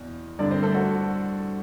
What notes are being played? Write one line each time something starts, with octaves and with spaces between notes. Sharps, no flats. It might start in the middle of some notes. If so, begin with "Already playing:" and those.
Already playing: E2 B2
G2 D3 D4 D5
C4 C5
A3 A4
F#4